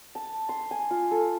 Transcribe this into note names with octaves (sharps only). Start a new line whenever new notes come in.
A5
C6
G#5
F4
A4